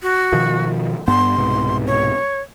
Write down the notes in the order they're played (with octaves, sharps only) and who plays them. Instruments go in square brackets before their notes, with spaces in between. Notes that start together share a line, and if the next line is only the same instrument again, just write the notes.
[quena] F#4
[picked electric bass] B2 D#3 F3
[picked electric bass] G2 B3 [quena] C6
[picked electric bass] C2 G#2 B2
[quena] C#5